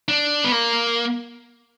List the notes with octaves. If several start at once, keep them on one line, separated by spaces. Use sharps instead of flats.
D4
B3
A#3